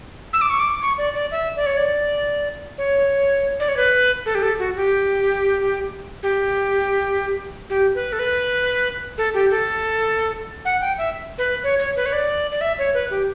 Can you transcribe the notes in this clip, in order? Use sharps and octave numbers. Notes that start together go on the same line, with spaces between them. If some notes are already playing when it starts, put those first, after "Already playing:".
E6
D6
C#6
D6
C#6
D5
D5
E5
D5
C#5
D5
C#5
D5
C#5
B4
A4
G4
A4
F#4
G4
G4
G4
B4
A4
B4
A4
G4
A4
F#5
G5
E5
B4
C#5
C#5
B4
C#5
D5
D5
E5
C#5
B4
G4